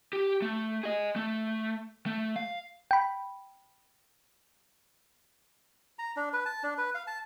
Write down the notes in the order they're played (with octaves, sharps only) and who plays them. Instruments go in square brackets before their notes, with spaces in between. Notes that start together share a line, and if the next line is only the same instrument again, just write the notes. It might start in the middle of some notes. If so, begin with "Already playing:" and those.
[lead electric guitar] G4
A3
G#4 D#5
A3
A3
F5
[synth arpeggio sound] G5 B5
[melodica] A#5
D4
B4
A5
D4
B4
F5
A5